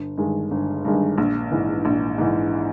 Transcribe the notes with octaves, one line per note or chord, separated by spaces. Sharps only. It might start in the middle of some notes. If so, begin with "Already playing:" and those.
Already playing: G1
G2 D#3 G#3
G1
G2 D#3 G#3
A#1
G#2 E3
A#1
G#2 E3